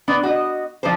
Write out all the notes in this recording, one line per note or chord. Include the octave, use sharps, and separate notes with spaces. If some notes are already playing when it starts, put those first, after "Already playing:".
B3 D4
F#4 D#5
F3 C4 D4 C5